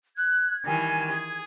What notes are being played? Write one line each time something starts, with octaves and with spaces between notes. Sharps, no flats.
F#6 G#6
D#3 E3 G3 G#5
G#4